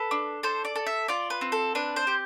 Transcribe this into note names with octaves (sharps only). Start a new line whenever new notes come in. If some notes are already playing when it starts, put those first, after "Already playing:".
Already playing: A4 B4
D4
A4 C5
D5
A4
E5
F4 D5
B4
C4
A4
D4 B4
C5
G4